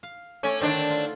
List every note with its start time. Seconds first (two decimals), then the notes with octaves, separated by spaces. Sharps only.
0.03 F5
0.43 A3 C#4 D5
0.61 D3 D#3 A3 C4 D4
0.90 F4